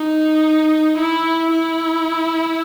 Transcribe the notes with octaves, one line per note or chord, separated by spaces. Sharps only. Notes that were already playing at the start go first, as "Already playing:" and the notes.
Already playing: D#4
E4
E4